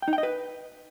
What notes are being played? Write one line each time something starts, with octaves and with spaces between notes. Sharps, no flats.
G5
D#4
G5
D#5
B4